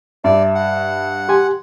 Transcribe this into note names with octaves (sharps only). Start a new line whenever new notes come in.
G2 D5 E5
F#5
G4 G#5 C6